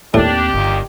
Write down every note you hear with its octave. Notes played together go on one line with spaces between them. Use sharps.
D#2 A2 C4 D4 G4
G1 A#2 D#3